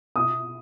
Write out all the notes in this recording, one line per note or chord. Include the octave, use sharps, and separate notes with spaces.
D#6